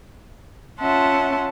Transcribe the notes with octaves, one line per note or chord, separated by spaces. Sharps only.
C#4 F4 E5 F#5 A5 C6